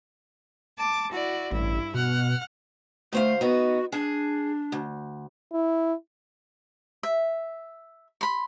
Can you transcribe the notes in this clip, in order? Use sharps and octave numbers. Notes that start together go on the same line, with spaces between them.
A5 D6
E4 F#4 D5
A1 G2 E4
B2 F#5 F6
D2 A3 C5 F5
B3 D#4 F#4
D4 G#4
D2
E4
E5
B5 C6